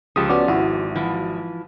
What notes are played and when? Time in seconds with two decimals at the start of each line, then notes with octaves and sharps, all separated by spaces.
0.16 C#2 C#3 F3 G4 A5 D#6
0.29 B3 C#4 F#4 D5
0.48 G#1 E4 F#4
0.95 E3 F3